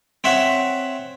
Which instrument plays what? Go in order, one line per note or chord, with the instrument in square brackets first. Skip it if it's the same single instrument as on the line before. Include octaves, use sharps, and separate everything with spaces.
[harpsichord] C4 C#5 E5 F#5